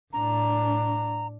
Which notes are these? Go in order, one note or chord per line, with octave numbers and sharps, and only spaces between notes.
A2 D4 A#5